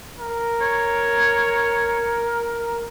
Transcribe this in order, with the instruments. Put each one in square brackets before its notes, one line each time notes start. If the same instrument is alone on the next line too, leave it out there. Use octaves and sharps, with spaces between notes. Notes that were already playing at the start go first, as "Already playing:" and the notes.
[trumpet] A#4
[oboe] C#5